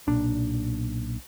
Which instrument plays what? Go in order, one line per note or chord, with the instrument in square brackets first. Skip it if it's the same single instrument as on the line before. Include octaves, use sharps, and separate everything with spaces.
[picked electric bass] B1 A#2 D4